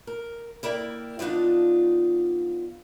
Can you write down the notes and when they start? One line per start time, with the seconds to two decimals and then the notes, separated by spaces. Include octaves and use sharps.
0.07 A#4
0.63 A#3 E4 A#4 D5 G5
1.19 F3 B3 D4 D#4 F4